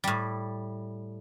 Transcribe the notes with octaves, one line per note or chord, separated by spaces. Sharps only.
A2 G3